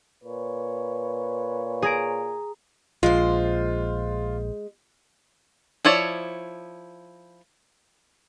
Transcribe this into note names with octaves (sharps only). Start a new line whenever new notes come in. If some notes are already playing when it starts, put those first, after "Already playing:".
A#2 B4 C#5
G#4 A#5 D7
A#1 G#3 F4 C5
F3 E4 C#5 D5